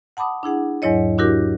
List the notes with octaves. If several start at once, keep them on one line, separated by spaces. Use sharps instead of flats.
F#5 A5 B5 D6 D#6
D4 E4 G#4 F#5
E2 G#2 F#3 E4 C#5 D#5
D4 E4 F#4 G4 A#4 D6